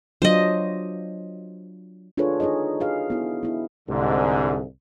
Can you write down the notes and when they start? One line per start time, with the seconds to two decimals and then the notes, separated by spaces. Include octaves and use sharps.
0.22 F#3 D4 F4 C5 D#5
2.17 D4 F4 G#4 A4 B4 C#5
2.40 D#4 G#4 C#5 D#5
2.80 F#4 G#4 B4 F5
3.10 B3 E4 F#4
3.43 B3 E4
3.89 C2 G#2 D3